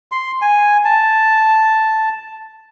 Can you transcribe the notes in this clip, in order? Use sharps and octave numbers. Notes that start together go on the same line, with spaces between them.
C6
G#5
A5